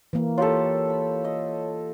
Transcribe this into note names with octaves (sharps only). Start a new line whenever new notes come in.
E3 A#3
F4 G4 A4 C#5
B5
D#5